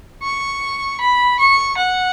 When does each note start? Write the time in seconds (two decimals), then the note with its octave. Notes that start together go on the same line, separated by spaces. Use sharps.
0.23 C#6
1.00 B5
1.39 C#6
1.78 F#5